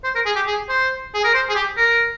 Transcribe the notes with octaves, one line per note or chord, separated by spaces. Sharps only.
C5
A#4
G#4
G4
G#4
C5
G#4
A#4
C5
G#4
G4
A#4